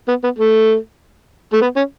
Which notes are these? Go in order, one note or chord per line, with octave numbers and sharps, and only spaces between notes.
B3
B3
A3
A3
B3
C#4